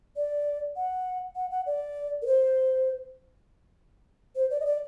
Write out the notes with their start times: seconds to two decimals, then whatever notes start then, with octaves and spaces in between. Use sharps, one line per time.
0.16 D5
0.76 F#5
1.36 F#5
1.51 F#5
1.66 D5
2.22 A#4
2.26 C5
4.36 C5
4.51 D5
4.60 D#5
4.66 D5